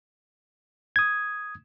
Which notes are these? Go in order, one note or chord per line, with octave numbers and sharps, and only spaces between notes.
D#6 G#6